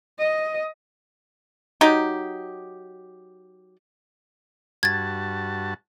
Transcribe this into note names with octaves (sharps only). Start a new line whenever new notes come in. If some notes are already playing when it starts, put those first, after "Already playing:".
D#5
F#3 D#4 G4
G2 F#4 A5 G#6 A6